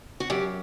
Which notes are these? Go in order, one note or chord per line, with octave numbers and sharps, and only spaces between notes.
F#4
F#2 G4